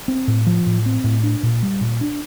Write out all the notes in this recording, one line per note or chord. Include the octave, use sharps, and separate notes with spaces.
C4
A2
F3
A2
C4
A2
D4
A#2
G3
A#2
D4